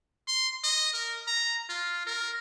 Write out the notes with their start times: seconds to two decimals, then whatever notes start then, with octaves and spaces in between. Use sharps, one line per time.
0.28 C6
0.64 D#5
0.93 A#4
1.27 A#5
1.69 F4
2.07 A#4